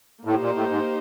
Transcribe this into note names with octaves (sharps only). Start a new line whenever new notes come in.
A2 A#3 D#4 G4 C5
A#2
A2
G#2